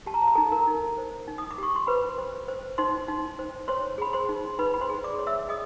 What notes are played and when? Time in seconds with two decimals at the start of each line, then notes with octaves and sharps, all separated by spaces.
0.06 G4 A5
0.14 A#5
0.22 A5
0.28 A#5
0.35 D#4 A4 A5
0.52 A#4 A#5
0.67 D#4
0.98 C5
1.28 D#4
1.38 D#6
1.51 D6
1.58 G4 C#6
1.76 C6
1.87 B4 C5 B5
2.18 C5
2.48 C5
2.78 D#4 C5 C6
3.08 D#4
3.39 C5
3.68 C5 C#5 C6
3.98 G#4 B5
4.13 C5 C6
4.29 D#4
4.59 D#4 B4 B5
4.74 B5
4.81 C5 C6
4.89 G#4
5.04 D5 D6
5.19 C#5
5.27 E5 E6
5.49 G#4 D#5 D#6